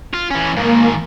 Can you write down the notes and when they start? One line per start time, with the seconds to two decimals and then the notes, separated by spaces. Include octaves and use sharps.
0.14 F4
0.30 E3 C#4
0.57 G#2 D#3 A#3